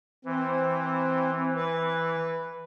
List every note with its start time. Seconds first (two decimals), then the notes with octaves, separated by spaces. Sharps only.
0.25 E3 C4
1.56 B4